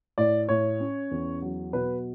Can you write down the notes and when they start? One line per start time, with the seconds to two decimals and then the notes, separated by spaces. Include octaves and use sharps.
0.18 A2 D5
0.49 A2 C#5
0.80 C#4
1.11 E2
1.42 F#3
1.73 B2 B4